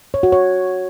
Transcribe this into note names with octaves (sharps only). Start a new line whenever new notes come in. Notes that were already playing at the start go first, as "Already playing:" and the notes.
C#5
F#4
C#5